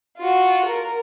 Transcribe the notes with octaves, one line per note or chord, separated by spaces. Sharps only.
F4 F#4
A#4